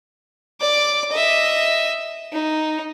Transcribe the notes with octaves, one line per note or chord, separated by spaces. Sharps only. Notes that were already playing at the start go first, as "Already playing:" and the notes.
D5 D6
D#5 E5
D#4